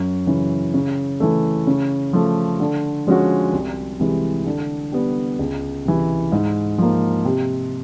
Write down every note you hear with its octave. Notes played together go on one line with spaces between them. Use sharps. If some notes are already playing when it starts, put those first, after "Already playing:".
Already playing: F#2
C#3 E3
C#3
E3 A3
C#3
F3 A3
D3
F3 G#3 C#4 F#4
C2
C3 E3 G#3
D3
G3 B3
C#2
C3 E3
G#2
F3 A#3
C3